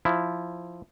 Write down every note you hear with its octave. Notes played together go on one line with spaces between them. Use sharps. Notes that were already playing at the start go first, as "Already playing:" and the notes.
F3 E4